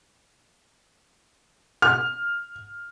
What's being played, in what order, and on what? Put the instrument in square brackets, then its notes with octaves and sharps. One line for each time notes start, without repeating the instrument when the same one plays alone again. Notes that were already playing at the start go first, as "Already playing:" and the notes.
[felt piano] F6